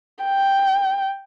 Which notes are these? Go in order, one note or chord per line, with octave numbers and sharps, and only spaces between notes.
G5